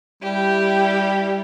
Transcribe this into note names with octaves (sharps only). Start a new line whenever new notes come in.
G3 E4 G4